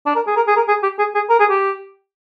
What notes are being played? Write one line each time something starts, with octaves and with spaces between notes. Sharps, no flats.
D4
A#4
G#4
A#4
G#4
A#4
G#4
G4
G#4
G#4
A#4
G#4
G4